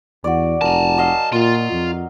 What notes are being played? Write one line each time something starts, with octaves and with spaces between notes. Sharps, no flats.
E2 F#4 D5
F1 A#4 G#5 A5
F#3 D#5 F5
A#2 F4
F2